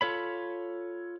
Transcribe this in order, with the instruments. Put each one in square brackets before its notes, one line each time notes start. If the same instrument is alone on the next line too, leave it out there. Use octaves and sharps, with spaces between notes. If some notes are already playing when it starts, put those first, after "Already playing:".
[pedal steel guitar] F4 A4 C#5 B5